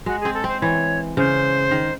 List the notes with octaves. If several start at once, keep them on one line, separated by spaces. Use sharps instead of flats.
G#3 F#4
C4 G#4
A4
C4 C5
E3 C#5
C#3 C5
D#3